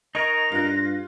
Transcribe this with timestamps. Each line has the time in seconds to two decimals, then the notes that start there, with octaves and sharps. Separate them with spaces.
0.15 D#4 A#4 D#5 C#6 G#6 A#6
0.52 G2 F4 F#6